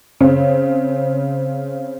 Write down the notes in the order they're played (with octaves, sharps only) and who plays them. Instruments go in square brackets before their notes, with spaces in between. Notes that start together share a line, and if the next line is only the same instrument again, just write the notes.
[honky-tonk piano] C#3 C4 C#4